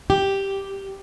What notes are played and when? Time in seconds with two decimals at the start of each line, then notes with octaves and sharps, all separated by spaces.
0.10 G4